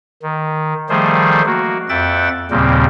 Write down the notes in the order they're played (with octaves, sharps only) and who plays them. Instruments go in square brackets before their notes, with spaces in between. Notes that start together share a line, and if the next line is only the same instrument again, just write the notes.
[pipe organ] D#3
D#3 F3 G3 A3 G#4 C5
A#3 F#4
F2 E5 F#5 G5 A6
D#2 A#2 C#3 G3 A#3 C4